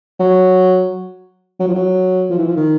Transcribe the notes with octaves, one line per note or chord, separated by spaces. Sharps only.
F#3
F#3
F3
F#3
F3
E3
F3
D#3